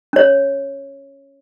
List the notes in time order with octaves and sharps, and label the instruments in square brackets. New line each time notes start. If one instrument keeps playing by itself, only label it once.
[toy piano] C#4 C#5